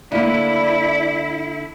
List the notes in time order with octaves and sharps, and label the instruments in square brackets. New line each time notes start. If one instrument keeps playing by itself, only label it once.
[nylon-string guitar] D3 A#3 [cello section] E4 [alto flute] D5